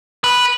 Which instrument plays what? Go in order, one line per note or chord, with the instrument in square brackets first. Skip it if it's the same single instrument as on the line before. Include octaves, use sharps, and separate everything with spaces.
[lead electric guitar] B4